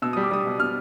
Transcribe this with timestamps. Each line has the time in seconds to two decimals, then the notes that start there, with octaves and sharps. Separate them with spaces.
0.02 B2 E6
0.13 G3 D#6
0.23 D6
0.31 G3 D#6
0.46 B2
0.59 B2 F6